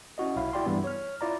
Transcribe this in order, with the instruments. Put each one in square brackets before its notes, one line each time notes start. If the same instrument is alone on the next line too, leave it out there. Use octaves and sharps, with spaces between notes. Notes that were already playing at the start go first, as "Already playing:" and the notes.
[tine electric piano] C#4 E4 F#4 D#5
B1 F#3 E4 F5
E4 F#4 D5 G5 C6
G2 E3 G3 B3 E4 E5
C#5 F6
E4 F4 D5 A#5